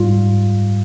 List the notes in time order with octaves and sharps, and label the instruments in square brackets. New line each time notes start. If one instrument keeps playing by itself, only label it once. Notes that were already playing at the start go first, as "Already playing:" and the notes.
Already playing: [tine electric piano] G#2 G3 F4